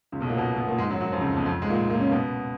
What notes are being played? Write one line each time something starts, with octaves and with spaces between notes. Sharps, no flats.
C#2 C#3
B1 B2
A#2 A#3
B2 B3
B2 B3
A#2 A#3
G#2 G#3
F#2 F#3
F#2 F#3
F2 F3
C#2 C#3
B1 B2
F2 F3
G#2 G#3
A#2 A#3
A#2 A#3
C#3 C#4
B2 B3